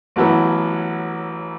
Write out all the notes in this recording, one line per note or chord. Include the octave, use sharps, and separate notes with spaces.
A1 A2 F#3 B3 E4